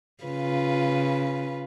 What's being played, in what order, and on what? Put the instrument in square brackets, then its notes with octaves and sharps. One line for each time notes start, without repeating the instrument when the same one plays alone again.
[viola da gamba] C#3 F4 B4